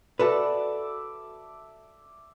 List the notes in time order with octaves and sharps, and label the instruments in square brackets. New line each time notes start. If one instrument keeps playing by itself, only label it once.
[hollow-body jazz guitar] F#4 A4 B4 [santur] D5 E5 A5